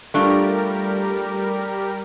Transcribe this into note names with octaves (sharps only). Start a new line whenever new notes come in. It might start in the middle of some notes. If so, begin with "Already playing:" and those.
G3 A3 D4 F4 G4 A#4